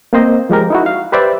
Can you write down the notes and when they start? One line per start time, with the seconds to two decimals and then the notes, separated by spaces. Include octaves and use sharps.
0.13 A#3 C4 C5 D#5
0.50 F3 G#3 G4 A#4
0.70 D#4 E4 F#4
0.86 F5
1.12 G4 B4 C5 D5 E5